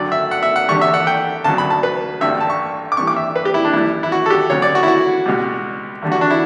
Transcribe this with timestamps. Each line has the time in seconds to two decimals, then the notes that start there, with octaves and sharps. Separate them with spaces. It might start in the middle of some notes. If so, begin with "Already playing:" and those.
Already playing: G2 D3 F#3 D5
0.12 E5
0.31 F#5
0.43 E5
0.56 F#5
0.68 E2 D3 G3 C#6
0.81 E5
0.94 F#5
1.07 G5
1.44 D2 C#3 F#3 A5
1.58 B5
1.70 A5
1.83 B4
2.21 A1 G2 D3 G3 E5
2.41 A5
2.50 C#6
2.92 D6
2.97 G2 E3 G3 C#6
3.07 D6
3.16 E5
3.36 B4
3.45 G4
3.54 E4
3.65 D4
3.73 F#2 E3 G3 E4
4.03 E4
4.12 F#4
4.26 A4
4.30 G4
4.50 D2 C#3 F#3 C#5
4.62 D5
4.75 F#4
4.83 E4
4.88 F#4
5.26 C#2 B2 G3
6.02 E2 D3 G3
6.12 F#4
6.21 D4
6.30 E4